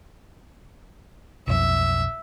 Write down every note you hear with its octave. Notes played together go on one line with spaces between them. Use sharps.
B1 F2 E5